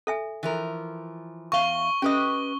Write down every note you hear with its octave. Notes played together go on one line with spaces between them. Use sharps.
A4 E5 G#5
E3 F3 A#4
E2 F5 C#6 G7
C#4 G4 B4 D#5 D#6